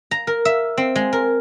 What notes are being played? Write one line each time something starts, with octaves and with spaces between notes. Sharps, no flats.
A#5
A#4
E5
C4
G#3
A#4